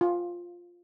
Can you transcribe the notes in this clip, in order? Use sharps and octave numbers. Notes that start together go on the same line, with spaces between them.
F4